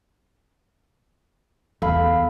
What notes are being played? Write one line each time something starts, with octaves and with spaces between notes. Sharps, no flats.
E2 A4 F5 B5